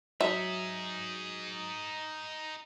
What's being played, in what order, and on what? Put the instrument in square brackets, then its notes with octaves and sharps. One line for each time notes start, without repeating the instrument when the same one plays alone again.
[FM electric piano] F#3 [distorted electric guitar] D#4 G#4 [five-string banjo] E5